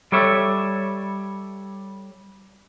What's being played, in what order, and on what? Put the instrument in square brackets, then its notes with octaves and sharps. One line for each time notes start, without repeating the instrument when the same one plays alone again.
[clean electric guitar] G3 A4 C#5 E5